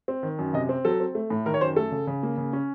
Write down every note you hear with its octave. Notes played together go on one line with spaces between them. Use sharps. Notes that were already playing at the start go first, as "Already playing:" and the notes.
C4
D#3
F#2
C3 D#5
C4
F#3 A4
C4
A3
A2
D#3 A#4
C#5
F#2 C5
A3 A4
C#3
C#3
A#3
C#3
C#4